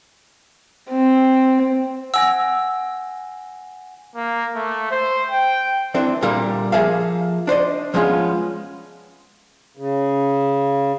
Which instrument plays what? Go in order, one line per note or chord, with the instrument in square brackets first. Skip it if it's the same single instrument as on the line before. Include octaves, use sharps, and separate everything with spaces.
[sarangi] C4
[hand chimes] F#5 G#5 A#6 [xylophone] E6
[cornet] A#3
A3
C5
G5
[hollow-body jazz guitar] E3 C4 D4 A4
A#2 D3 G3 A#3
F3 A#3 G#4 A4 E5 F5
D4 C5 D5 D#5
F3 G#3 B3 C#4 F4
[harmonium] C#3